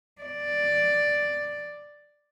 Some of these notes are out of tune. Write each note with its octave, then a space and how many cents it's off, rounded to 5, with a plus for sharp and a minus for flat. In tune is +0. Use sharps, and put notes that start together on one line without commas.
D5 +5